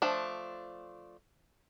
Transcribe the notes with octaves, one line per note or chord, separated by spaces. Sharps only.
F3 A3 D4